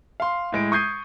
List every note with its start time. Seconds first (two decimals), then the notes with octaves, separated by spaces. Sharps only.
0.20 F5 C6
0.52 A2 G#3 D7
0.72 C#6 D#6 G6 G#6 C7 D#7